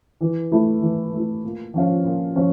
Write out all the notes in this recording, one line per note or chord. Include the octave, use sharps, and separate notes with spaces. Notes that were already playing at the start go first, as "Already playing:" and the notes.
E3
A3 E4
E3
A3 E4
A#2
F3 C#4 F4
A#2
F3 C#4 F4